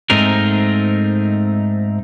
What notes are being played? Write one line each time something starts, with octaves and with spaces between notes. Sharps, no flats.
G#2 A3 C4 D#4 G#4 A#4